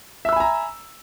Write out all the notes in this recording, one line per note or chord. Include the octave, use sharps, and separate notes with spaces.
E5 G#5 A#5 B5 E6